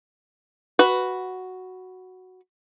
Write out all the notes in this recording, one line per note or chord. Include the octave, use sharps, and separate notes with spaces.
F#4 B4